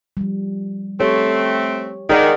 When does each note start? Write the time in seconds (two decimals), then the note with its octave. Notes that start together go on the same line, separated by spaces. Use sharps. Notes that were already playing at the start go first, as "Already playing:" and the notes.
0.17 F3 G3
1.00 A3 C4 G4 C#5
2.10 D#3 G#4 D5 F#5